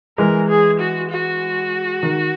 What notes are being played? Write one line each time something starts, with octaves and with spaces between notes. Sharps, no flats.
E3 G#3 A#4
G#4
F#4
F#4
D#3